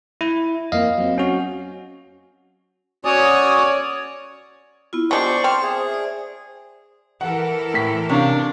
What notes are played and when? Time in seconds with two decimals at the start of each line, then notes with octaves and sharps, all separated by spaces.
0.21 E4
0.72 F2 F3 A#3 D#5 F5
0.98 F#3 C4
1.18 C#4 F#4
3.05 C#4 F#4 C#5 D5 G#5 D#6
4.93 B3 E4 F4
5.11 G3 G#3 D4 C5 D5 A5 C#6
5.44 C4 C#6 F6
5.62 G#4 C5 E5 D#6
5.89 C5 D5
7.21 E3 A4 A#4 F#5
7.74 A2 B6
8.09 C3 C#4 D4 F5